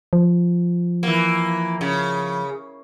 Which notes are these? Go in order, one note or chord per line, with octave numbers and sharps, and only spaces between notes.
F3
E3 A#3
C#3